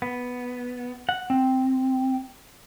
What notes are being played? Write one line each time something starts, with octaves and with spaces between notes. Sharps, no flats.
B3
F#5
C4